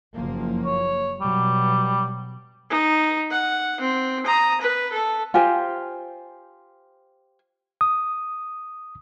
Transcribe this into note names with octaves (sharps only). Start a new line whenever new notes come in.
F#1 F3 A#3
C#5
B2 F#3 G3
D#4
F#5
C4
A#5 D#6
B4
A4
F4 G4 C5 G#5
D#6